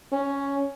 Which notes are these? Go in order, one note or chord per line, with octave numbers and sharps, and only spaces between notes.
C#4